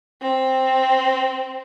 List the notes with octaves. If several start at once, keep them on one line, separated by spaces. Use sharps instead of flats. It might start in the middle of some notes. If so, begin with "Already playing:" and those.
C4